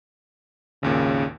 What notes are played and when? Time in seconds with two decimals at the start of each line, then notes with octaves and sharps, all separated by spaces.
0.83 G#1 D#2 A#2 C#3